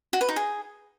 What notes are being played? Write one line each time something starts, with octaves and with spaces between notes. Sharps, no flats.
F#4
B4
D#4
G#4